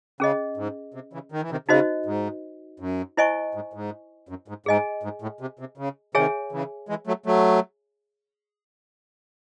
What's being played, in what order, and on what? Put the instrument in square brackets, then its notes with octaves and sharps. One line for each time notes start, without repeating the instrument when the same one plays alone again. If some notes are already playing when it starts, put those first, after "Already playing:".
[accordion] C#3 [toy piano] C#4 G#4 D#5
[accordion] G#2
C3
C#3 E3
D#3
E3
C3 D#3
[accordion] C#3 [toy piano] D#4 F#4 C5 D#5
[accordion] G#2
F#2
[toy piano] E4 C5 D#5 G#5 C#6
[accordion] G#2
G#2
F#2
G#2
[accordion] G#2 [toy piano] G#4 D#5 G#5
[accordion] G#2
A2
C3
C3
C#3
[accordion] C3 D#3 [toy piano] G#4 C#5 E5 G#5
[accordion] C#3 E3
E3 G#3
F#3 A3
F#3 A3